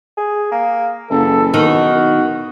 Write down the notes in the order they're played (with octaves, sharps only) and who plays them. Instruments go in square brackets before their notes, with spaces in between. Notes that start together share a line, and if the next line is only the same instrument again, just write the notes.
[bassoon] G#4
A#3
[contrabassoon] F#1 [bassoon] E3 [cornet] A4
[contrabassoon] B1 [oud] D#3 [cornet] F#4